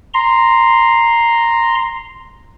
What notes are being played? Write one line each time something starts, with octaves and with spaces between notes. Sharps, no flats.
A#5 C6